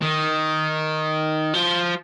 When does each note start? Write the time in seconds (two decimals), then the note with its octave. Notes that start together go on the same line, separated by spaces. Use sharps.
0.02 D#3
1.54 F3